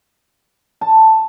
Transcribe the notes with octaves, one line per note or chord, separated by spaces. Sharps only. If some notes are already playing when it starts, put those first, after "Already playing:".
A5